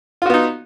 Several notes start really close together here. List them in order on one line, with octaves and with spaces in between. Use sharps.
F4 F#4 B3 D#4